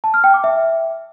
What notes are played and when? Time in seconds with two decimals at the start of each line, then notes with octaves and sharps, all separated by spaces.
0.04 A5
0.14 F6
0.24 G5
0.34 D6
0.44 E5